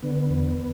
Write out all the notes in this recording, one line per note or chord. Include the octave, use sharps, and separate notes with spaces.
D3 B3
E2